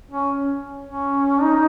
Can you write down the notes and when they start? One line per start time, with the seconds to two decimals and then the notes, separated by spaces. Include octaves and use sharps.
0.11 C#4
0.86 C#4
1.41 D#4